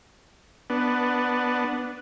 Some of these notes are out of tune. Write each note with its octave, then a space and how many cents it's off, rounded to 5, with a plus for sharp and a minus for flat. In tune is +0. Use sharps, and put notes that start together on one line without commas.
B3 +0 D4 +0